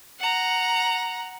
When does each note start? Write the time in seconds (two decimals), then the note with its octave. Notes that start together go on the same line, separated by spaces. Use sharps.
0.19 F#5 A#5